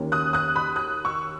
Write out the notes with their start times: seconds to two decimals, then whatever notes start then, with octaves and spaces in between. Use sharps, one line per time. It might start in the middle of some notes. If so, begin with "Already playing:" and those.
Already playing: D#2 D#3 A#3 C#4
0.12 D#6 F#6
0.33 D#6 F#6
0.56 B5 D#6
0.76 D#6 F#6
1.05 C#6 E6